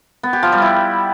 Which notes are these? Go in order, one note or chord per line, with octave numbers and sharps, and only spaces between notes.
B3
G4
F3
G3
E4